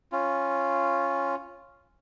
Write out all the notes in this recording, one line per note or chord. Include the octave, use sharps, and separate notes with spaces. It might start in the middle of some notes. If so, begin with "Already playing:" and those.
C#4 F4